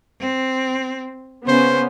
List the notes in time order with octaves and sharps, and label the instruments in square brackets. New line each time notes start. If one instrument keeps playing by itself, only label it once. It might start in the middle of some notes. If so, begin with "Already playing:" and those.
[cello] C4
[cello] C#3 [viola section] B3 C#4 [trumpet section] C5